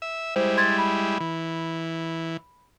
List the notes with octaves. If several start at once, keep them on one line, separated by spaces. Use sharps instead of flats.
E5
G3 G#3 E4 C5
C6 G#6 A6
B5
E3